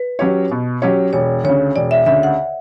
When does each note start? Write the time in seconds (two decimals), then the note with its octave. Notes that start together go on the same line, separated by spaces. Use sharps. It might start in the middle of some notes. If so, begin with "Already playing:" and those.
Already playing: B4
0.19 F#3 C#4 G4 C#5
0.51 B2
0.82 F#3 C#4 G4 C#5
1.13 E1 C#5
1.44 D2 C#3 C#5
1.76 E1 D5
1.91 E5
2.06 D2 C#3 E5
2.23 F#5